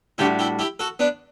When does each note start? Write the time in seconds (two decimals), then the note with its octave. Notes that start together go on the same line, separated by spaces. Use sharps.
0.18 A2 G3 D4 E4 F#4 G4
0.39 E4 G4
0.59 E4 G4
0.80 F#4 A4
0.99 B3 D4